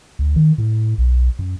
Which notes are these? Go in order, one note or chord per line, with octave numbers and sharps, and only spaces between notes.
D2
D#3
A2
B1
F#2